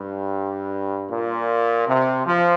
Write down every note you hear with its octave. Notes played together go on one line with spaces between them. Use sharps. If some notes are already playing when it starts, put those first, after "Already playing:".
Already playing: G2
A#2
C3
F3